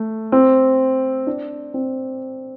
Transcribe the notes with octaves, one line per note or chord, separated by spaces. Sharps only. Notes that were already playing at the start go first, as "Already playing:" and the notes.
Already playing: A3
C4
D4
C4